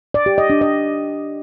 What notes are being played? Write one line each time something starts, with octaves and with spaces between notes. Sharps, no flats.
D5
G4
D#5
D4
D#5